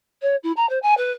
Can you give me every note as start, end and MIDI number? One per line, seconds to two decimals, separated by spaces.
0.22 0.36 73
0.43 0.52 64
0.57 0.68 82
0.69 0.79 72
0.83 0.95 80
0.97 1.12 71